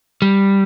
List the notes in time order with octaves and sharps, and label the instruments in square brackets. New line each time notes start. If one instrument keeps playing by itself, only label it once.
[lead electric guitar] G3